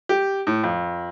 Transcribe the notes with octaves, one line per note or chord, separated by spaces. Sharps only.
G4
A2
F2